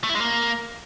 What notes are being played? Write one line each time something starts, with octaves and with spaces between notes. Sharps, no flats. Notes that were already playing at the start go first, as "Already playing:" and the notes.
A3
E4
G#3
A#3